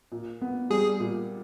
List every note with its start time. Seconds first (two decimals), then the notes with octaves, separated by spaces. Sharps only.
0.12 A#2
0.41 B3
0.70 G3 G#4
1.00 A#2